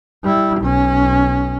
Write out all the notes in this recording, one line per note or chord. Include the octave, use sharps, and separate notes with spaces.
G3 E4
B1 C#4